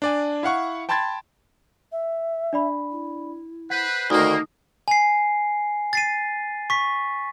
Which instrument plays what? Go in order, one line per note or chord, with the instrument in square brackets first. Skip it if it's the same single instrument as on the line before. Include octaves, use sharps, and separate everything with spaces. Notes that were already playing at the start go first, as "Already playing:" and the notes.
[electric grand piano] D4 D5 G#5
E4 F5 F#5 C#6
G5 A5 B5 C6 G#6 A6
[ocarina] E5
[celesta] D4 D5 B5
[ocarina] E4
[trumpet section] B4 C5 [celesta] F#5 B6
[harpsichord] D2 D#3 [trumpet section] A#3 [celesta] D#4 D#6
[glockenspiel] G#5 C7
A6 C7 D#7
C#6 B6